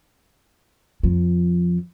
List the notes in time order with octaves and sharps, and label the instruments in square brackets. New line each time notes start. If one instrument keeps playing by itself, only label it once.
[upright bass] F2 F3